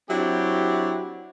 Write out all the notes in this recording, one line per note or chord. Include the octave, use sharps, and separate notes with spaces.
F#3 C4 D4 E4 F#4 G4